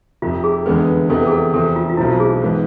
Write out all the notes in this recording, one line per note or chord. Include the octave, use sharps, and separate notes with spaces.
F1 F2 C3 F4
G#4
F1 E2 D3 G#3 B3 B4
F1 E2 C3 E3 B3 A4
G#4
A4
E2 C3 F3 A4
F4
F4
B1 B2 A3 C4 E4
F4
G#4
G#2 E3 B3